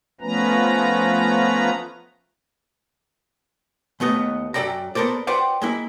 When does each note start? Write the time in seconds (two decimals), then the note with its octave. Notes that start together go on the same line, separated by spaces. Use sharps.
0.21 F3 A3 B3 C#4 B4 A#5
4.00 D#2 A3 B3 D#5
4.54 F#2 F#3 A4 D5 G5 A#5
4.95 B3 A4 A#4 C5 D5
5.27 F4 B4 C5 D5 F#5 G5
5.62 G#3 A#3 E4